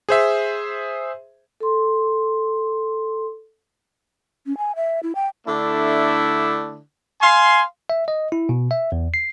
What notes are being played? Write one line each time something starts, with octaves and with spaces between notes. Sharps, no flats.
G#4 C5 E5
A4 C6
C#4
G#5
E5
E4
G5
D3 A3 D4 E4
F5 G#5 C6
E5
D#5
E4
B2
E5
E2
C7